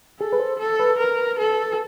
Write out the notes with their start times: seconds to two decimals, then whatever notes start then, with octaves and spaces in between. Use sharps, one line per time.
0.20 G#4 A4
0.33 B4
0.40 C5
0.59 A4
0.79 B4
0.99 A#4
1.39 A4